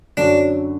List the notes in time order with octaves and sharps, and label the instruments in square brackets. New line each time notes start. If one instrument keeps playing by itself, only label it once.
[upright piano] F#2 D3 F#3 C#4 F#4 [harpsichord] D4